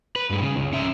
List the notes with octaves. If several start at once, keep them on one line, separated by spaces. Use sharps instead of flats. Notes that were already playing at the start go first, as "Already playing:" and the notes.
B4
G2 G#3
C#3
C#2
C#4 E5